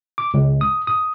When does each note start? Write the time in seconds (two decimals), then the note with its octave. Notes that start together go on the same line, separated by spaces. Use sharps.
0.18 D6
0.34 C#2
0.61 D#6
0.87 D#6